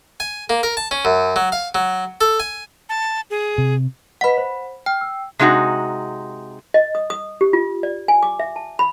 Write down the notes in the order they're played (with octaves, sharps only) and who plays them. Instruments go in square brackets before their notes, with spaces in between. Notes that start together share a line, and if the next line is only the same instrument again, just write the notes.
[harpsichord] G#5
A#3
A#4
A5
C#4
F#2
F#3
F5
F#3
A4
G#5
[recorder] A5
G#4
[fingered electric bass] C3
[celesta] B4 D#5 B6 [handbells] F#5 B5
[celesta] C5
[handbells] G5 [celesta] F6
[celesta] E6
[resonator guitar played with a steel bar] C3 G#3 D#4 F#4
[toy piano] D#5
D#6
D#6
G4
F4
D5
G#5
D6
E5
A5
B5